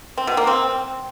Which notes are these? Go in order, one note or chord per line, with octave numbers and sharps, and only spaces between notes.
C4
B2
A#3
C4